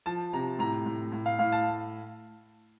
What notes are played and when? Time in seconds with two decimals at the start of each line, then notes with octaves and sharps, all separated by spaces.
0.06 F3 A5
0.33 C3 A#5
0.59 A2 A#5
0.86 A2
1.12 A2
1.26 F5
1.39 A2 F5
1.52 A5